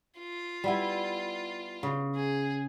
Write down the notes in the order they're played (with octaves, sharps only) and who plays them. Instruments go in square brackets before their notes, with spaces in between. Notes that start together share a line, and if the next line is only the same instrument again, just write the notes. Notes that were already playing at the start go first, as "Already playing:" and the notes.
[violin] F4
[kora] G3 B3 E4
C#3
[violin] G#4